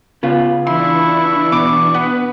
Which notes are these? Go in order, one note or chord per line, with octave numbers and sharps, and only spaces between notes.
C#3 B3 F4
E3 D4 E4 C6 C#6
B2 D6
B3 B4